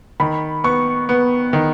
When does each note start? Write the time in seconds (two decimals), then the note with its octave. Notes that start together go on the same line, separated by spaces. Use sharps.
0.20 D#3 B5
0.64 B3 C#6
1.09 B3
1.53 D#3